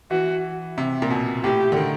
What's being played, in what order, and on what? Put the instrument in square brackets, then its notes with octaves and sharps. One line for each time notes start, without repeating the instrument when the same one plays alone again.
[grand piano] E3 [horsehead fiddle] F#4
[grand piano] C3
A#2
B2
[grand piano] A2 [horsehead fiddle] G4
[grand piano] D3
D#3